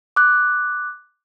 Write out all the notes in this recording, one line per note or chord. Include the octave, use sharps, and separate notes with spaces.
D6 F#6